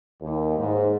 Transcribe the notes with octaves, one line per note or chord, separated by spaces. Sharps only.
D#2
G#2